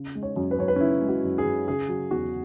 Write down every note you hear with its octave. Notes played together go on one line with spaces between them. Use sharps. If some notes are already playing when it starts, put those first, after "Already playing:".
Already playing: C#3
G#3
C#5
F#2
B4
F#2 C#5
B4
C#4
C#3 E4
G#3
F#4
F#2
G#4
F#2
C#3 G#4
F#3
E2 F#4